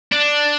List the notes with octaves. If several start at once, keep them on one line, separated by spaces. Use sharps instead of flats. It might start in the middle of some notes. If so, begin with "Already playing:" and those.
D4